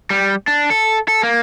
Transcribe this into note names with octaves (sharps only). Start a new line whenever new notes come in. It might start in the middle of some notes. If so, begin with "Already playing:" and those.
G3
D4
A4
A4
A#3